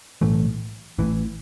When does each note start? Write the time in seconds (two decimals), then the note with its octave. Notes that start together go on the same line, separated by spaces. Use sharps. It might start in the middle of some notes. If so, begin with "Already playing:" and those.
0.21 B1 A2 E3 A3
0.99 A1 A2 E3